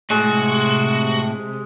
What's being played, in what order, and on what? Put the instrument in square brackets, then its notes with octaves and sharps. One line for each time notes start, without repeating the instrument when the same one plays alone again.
[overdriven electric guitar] A2 [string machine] C3 [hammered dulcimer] G#3 [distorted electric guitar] F#4